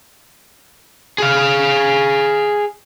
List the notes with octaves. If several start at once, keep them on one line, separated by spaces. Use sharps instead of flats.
G#4 F5